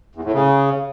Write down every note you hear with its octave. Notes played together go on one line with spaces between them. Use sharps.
E2
A2
C#3